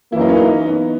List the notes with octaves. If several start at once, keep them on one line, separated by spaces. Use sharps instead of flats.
F#2 E3 A#3 E4
D#4
C#4
D#4
B3